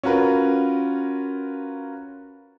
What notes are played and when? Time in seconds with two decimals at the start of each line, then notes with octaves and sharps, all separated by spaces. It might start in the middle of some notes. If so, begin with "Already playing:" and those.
0.03 C#4 F4 F#4 A#4 B4